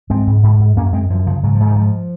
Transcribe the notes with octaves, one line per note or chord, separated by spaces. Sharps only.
G#2 G#3 C4
G#2
G#2
G#2
F#2 A#3 C#4
F#2 G#3 C4
F#2 F3
C#3 F3
G#2 F#3
F3
G#2
D#3
G#2 F3